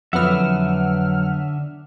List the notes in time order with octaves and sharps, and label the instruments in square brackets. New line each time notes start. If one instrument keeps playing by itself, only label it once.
[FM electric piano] F2 B3 [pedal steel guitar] D3 E5 [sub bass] F#3 [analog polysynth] F#5 F6